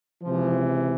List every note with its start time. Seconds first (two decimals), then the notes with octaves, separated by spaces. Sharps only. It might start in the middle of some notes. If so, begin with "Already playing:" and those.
0.22 C#2 C3 E3 F3